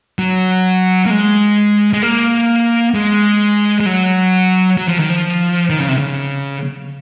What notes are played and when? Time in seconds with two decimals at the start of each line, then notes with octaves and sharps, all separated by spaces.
0.19 F#3
1.06 A#3
1.10 G#3
1.93 G#3
2.03 A#3
2.94 G#3
3.81 G#3
3.86 F#3
4.77 F#3
4.88 F3
4.99 D#3
5.10 F3
5.70 D#3
5.79 C#3
5.88 C3
5.98 C#3